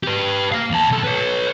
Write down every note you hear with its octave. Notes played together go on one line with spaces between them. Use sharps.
G4 B4
A#3 F5
D#2 A5
B1 A4
B4 C#5